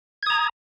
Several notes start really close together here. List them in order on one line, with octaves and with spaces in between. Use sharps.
G#6 D#6 A#5